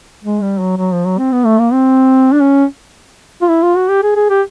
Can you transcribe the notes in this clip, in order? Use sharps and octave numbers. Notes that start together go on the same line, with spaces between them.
G#3
G3
F#3
F#3
F3
F#3
C4
B3
A3
A#3
C4
D4
C#4
F4
E4
F4
F#4
G4
G#4
G#4
G4